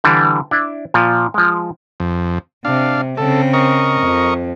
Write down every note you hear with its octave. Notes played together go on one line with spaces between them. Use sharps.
D3 E3 G3
D4 E4
A#2 F3
F3 G#3
F2
C3 D4 F5
C#3 C4 A4
A#4 D#5 C#6
F2